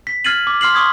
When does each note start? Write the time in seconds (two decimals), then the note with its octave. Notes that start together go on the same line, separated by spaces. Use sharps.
0.07 B6
0.24 F6 G#6 A6 C7 D#7 F#7
0.47 D6
0.61 C6 F6 C7 F#7
0.74 C6 C#6 D#6 G#6 B6